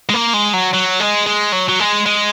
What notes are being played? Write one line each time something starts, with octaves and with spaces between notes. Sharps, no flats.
G#3
A#3
G#3
F#3
F#3
G#3
G#3
F#3
F#3
G#3
G#3